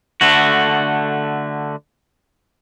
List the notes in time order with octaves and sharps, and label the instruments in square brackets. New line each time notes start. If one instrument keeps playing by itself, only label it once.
[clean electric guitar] D3 A3 F#4